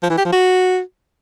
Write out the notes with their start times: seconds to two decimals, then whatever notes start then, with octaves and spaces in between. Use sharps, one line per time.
0.03 F3
0.10 E3
0.17 G4
0.25 F3
0.32 F#4